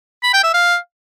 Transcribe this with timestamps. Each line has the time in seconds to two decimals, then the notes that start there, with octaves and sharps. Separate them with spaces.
0.23 B5
0.33 G5
0.44 E5
0.54 F5